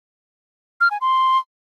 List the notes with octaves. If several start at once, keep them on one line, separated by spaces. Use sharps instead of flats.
F6
G#5
C6